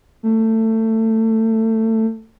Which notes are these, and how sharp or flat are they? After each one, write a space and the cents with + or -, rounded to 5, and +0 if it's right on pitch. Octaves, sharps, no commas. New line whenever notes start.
A3 +20